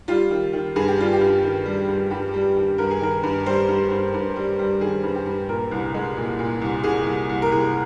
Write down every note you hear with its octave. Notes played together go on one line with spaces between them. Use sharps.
G3 F4
D#3
D#3
G2 G#4
G4
G3 F4
G4
G2
D#3
G3
G2
G2 G4
G3
D#3
G2 A#4
G#4
D#3 A#4
G2
G3 C5
G2
G2
G2
G3
G3
D#3 G#4
G2
G4
G2
A#2 A#4
C2
G#3
A#2
A#2
C2
C2 G#4
C2
C2
A#4
C2 G#4